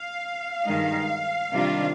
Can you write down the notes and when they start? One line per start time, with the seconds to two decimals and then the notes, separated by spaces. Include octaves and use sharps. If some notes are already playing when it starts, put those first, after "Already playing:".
Already playing: F5
0.65 G2 D#3 G#3 D#4
1.51 C3 D#3 G3 D4 F4